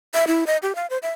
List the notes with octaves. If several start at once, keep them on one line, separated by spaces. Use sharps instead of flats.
E5
E4
D#5
G4
F5
C5
E5